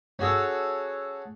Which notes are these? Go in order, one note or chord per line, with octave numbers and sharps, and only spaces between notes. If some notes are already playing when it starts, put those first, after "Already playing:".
C#4 F#4 G#4 A4 C#5